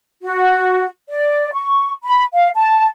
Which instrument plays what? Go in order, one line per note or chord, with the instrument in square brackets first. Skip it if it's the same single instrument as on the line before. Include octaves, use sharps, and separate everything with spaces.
[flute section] F#4
D5
C#6
B5
F5
A5